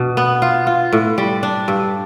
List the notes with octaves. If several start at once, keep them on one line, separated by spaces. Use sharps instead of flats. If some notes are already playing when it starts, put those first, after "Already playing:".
Already playing: B2 D4
B3
F4
F4
A2
G3
D4
G2